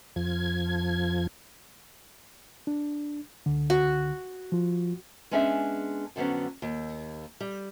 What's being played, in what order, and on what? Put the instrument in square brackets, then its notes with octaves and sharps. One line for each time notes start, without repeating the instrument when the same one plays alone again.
[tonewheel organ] F2 F3 G#6
[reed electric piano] D4
C#2 D3
[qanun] F#4
[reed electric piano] F3 F4
[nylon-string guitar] G#3 B3 C#4 D4 G#4 E5
F2 D3 F#3 B3 C#4
D#2
G3